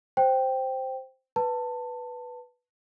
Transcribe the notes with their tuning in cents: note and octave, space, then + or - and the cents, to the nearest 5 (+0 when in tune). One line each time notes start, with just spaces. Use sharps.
C5 +0 G5 +0
B4 +0 A5 +15